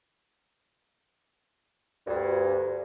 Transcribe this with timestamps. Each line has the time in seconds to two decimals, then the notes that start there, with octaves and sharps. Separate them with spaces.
2.06 D2 G2